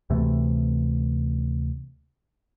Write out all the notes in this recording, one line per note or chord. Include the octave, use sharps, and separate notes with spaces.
D2 C3 E3 A3